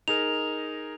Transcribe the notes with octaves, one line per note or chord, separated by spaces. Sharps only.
D#4 G#4 A#4 F7